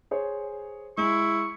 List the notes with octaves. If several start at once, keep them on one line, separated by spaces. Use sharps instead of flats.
G#4 C5 C#5
G#3 E4 C#6